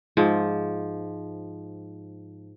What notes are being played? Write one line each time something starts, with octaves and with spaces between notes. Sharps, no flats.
G#2 F3